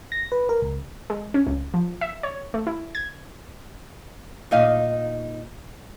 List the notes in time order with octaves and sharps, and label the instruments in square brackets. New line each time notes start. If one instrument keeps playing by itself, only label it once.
[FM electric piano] A#6
B4
A#4
C#2
[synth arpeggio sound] G#3
C#4
C#2
F3
E5
C#5
A3
E4
G#6
[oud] A#2 D#4 F5